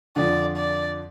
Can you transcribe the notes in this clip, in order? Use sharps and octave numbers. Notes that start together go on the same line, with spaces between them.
F2 D3 F3 D5
D5